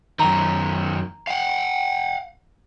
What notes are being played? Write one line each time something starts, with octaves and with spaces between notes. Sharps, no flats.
F#2 D#3 A#5
F5 F#5